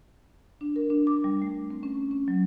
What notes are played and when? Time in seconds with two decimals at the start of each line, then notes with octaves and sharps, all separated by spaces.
0.61 D4
0.76 A#4
0.90 D4
1.07 D6
1.24 G3
1.42 A3
1.70 C4
1.83 C#4
2.11 C#4
2.28 F#3